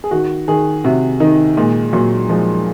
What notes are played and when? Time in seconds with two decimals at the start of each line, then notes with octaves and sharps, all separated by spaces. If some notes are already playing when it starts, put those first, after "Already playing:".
0.04 G#4
0.11 D#3 F#4
0.48 D#3 G#4
0.84 C3 F#4
1.20 D#3 D#4
1.57 A#2 G#3
1.93 A#2 F#3
2.29 F3 G#3